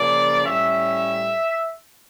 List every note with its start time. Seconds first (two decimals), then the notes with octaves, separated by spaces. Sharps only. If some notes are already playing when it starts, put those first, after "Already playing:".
Already playing: C#3 F3 A#3 C#4 D5
0.46 A2 G3 C#4 E5